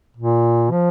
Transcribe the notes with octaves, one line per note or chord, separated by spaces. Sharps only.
A#2
F3